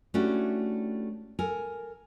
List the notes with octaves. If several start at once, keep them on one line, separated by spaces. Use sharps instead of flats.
A3 C#4 D4 E4 F#4 G4
A4 A#4 G#5